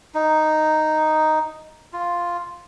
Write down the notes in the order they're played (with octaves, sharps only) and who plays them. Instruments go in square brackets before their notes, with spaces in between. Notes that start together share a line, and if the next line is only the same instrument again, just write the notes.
[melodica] D#4
F4